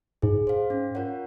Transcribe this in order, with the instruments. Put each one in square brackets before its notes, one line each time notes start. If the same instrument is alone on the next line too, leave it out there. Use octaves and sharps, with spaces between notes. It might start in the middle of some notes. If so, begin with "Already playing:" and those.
[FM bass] G#2 [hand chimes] G#4
[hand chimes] C5 F5
C#4
F4 A#4 C#5 F#5